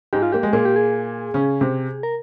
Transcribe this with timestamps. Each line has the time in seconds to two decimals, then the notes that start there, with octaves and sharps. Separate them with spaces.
0.13 G#2 G#3 G4
0.23 F4
0.32 A#3 G4
0.43 G#3
0.53 A#2 A#3 G#4
0.65 G4
0.76 G#4
1.34 C#3 C#4
1.61 C3 C4
2.03 A#4